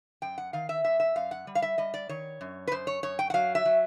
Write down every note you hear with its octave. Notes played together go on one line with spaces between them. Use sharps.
F#2 G5
F#5
D#3 F5
E5
F#2 E5
E5
F#2 F5
F#5
G3
F5
E5
G3 D#5
D5
D#3 C#5
F#2
B4
F#2 C5
C#5
F#2 C#5
G5
F#5
F#3 F5
E5
F#3